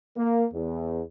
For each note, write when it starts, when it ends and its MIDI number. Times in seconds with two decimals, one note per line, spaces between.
0.17 0.44 58
0.53 1.02 40